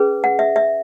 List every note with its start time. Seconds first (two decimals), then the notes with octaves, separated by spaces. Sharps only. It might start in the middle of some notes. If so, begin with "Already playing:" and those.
Already playing: C#4 G#4 B4
0.24 F#5
0.39 E5
0.56 E5